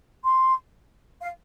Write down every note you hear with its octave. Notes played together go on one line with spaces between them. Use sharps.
C6
F5